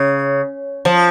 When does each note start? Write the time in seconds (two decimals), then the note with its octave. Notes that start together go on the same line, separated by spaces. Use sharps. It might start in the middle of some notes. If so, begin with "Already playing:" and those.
Already playing: C#3
0.85 F3